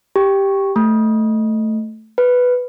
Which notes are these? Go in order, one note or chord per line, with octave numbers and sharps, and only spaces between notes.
G4
A3
B4